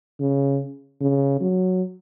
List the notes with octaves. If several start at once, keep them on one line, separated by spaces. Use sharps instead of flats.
C#3
C#3
F#3